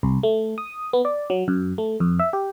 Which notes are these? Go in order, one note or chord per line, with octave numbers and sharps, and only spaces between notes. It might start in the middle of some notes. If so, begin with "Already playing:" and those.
C2
A3
D#6
B3
D5
F#3
F#2
A3
F2
E5
G4